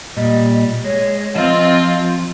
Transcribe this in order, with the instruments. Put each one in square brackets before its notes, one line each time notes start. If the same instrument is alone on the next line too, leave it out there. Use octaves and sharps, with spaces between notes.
[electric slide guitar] A#2 G3 [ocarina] D#5
[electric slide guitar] G#3 [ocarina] C#5
[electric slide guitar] F3 [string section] C4 F4 [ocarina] D#5